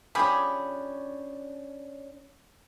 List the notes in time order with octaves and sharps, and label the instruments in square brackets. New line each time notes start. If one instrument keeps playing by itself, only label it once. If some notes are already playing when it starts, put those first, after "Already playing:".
[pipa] F3 G4 G#4 [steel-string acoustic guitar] C#4 D4 C#5 [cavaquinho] B5